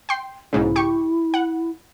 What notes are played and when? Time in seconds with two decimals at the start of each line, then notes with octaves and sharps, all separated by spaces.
0.09 G5 C6
0.53 B1 G#2 C#3 E4
0.76 G4 C#6
1.34 F#5